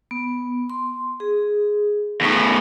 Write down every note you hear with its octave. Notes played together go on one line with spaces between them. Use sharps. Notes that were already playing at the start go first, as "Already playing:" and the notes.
B3
C6
G#4
E2 A2 D#4